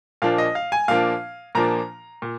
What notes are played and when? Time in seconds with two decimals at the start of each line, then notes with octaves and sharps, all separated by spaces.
0.22 A#2 F3 A#3 D4 F5
0.38 D#5
0.55 F5
0.72 G#5
0.88 A#2 F3 A#3 D4 F5
1.55 A#2 F3 A#3 D4 A#5
2.22 A#2